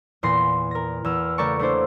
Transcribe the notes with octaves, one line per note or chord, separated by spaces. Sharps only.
E2 A#2 C6 A#6
A#4 A#6
E2 E6 F6
C#3 A3 A#4 D5 A5 C#6
A3 A#3 D4 E4 C5 D5